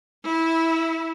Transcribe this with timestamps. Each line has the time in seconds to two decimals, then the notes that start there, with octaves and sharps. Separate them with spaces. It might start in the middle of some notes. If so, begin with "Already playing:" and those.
0.24 E4